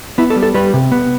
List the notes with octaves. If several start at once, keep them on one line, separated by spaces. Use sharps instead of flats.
B3 E4
A4
G3
A4
G3 B4
C3
B3